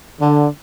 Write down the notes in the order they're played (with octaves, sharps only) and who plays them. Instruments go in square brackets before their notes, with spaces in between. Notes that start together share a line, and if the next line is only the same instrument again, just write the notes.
[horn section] D3